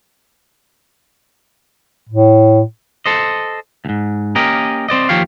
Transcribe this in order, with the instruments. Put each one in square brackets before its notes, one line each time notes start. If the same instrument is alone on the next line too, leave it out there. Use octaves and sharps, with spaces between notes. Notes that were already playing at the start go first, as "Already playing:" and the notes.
[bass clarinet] A2
[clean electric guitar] A4 C5 D#5
D2 G#2
A#3 C#4 G4 A#4 D#5
C4 C5 D5 D#5
D#2 F3 G4 C#5 F5